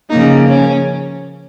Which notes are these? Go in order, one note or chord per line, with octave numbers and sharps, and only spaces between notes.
C#3 F3 A#3 D#4
C#4